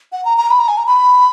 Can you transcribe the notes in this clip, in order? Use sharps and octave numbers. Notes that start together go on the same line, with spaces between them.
F#5
A#5
A#5
B5
A#5
G#5
A#5
B5